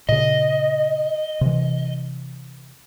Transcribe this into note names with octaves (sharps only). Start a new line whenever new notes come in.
A#2 C#3 D#5
C3 E3